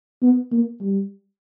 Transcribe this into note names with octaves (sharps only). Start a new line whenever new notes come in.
B3
A#3
G3